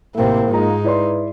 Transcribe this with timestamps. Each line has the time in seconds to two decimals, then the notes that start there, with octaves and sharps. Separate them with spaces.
0.15 A1 C3 A#3 C4 E4
0.51 G#2 G#3 D#4 F4 A#5
0.84 E4 B4 D5 C6